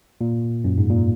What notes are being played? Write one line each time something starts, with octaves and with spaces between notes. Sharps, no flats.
A#2
F#2
G#2
A#2